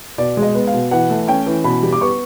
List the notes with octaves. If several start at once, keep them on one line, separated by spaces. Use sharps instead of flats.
B2 D5
G#3
D#5
B3
F5
B2
E3 F#5
A3
C#4 G5
E3
B2 B5
G3
D6
B3 C#6